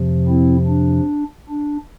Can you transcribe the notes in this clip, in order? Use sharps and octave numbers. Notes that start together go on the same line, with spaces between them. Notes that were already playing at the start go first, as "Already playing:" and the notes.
Already playing: F2 C3 F3
C4 E4
D4
D4